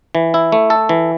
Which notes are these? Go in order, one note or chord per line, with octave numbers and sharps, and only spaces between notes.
E3
E4
A3
A4
E3